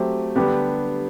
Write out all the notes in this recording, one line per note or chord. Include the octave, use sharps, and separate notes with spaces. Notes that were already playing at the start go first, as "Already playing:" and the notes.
Already playing: F#3 A3 C4 G4 C5
D3 G3 B3 D4 G4